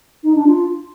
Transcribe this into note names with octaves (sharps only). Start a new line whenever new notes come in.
D#4
D4
F4